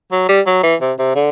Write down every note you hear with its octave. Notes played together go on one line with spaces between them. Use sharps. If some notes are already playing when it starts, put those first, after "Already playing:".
F#3
G3
F#3
E3
C3
C3
D3